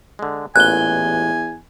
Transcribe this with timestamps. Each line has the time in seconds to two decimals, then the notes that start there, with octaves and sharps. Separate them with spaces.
0.19 D3 G#3
0.56 A1 E2 A#2 G#5 F#6 G7